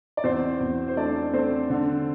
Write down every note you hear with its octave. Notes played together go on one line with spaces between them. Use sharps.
D5
E2 C4 C5
E2
C5
A3 D4 D5
A3 C4 C5
D3